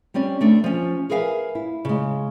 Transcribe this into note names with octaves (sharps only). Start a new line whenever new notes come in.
G3 C4 C#4 D5
D2 A3 D4
F3 C#4
G#4 A#4 B4 E5 F5 G#5
E4
C#3 G#3